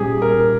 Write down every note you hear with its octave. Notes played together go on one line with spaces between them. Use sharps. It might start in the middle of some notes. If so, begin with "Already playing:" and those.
Already playing: A#2 G3 C#4 G4 G#4
A#4